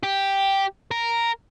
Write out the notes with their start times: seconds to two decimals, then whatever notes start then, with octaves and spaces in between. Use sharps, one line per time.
0.03 G4
0.91 A#4